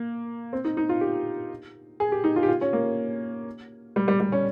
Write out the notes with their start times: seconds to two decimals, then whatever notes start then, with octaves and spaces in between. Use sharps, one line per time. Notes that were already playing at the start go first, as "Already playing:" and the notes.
Already playing: A#3
0.53 C4
0.65 D#4
0.77 D#4
0.89 F4
1.01 G4
2.00 G#4
2.12 G4
2.24 D#4
2.36 F4
2.43 G4
2.48 F4
2.61 C#4
2.73 A#3
3.96 G3
4.08 G3
4.20 G3
4.32 C#4